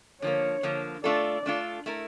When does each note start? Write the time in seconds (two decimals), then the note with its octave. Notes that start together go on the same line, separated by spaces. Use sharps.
0.22 D3 F3 A#3 C#5
0.63 D3 F3 A#3
1.04 A3 D4 F4 A4 D5
1.46 A3 D4 F4 A4
1.86 A3 E4 A#4